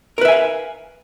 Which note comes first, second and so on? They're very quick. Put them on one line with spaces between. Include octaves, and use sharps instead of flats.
A#4 B4 E5 G#5 F5